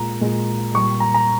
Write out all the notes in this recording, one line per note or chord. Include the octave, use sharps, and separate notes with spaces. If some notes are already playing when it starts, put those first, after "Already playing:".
Already playing: A#2 G#3 A#5
A#2 G#3
A#2 G3 C#6
A#5
A#5